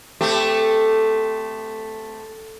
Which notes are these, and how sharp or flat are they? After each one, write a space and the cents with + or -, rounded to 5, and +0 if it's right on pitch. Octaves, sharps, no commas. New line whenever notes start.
A3 +0 C4 -25 G4 +10